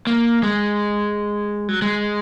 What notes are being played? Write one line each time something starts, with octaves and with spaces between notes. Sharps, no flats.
A#3
G#3
F#3
G#3